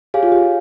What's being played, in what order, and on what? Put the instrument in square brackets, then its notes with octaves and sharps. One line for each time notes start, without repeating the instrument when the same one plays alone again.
[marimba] G4 [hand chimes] G#4 C#5 F5 G#5
[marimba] F4
G4